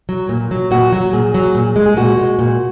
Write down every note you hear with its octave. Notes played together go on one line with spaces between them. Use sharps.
F#3
A#2
F#3
A#2 F#4
F#3
A#2 G#4
F#3
A#2
G#3
G#4
A#2 F#4
G#3
A#2